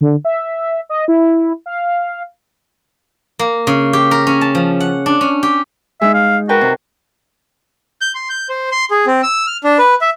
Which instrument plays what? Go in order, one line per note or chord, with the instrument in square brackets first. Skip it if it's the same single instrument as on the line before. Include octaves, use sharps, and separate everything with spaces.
[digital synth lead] D3
E5
D#5
E4
F5
[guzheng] A#3
C#3
G4
A#4
C#4
A5
F3
F#5
D4
C#4
G4
[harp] G#3 D#4 [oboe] E5
[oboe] F5
[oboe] F#4 [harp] A#4 B4 G5
[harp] C3
[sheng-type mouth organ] G6
C6
G6
C5
C6
G#4
C4
E6
F6
D4
B4
E5